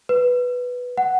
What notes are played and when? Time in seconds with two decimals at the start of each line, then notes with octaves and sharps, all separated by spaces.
0.09 B4
0.98 F#5